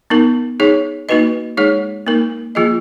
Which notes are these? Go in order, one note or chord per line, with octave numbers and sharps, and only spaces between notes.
B3 D#4 A#4
D#4 G#4 C#5
A#3 D#4 F#4 B4 D#5
G#3 D#4 G#4 C#5
A#3 D#4 A#4
F3 A#3 F4 G#4 D#5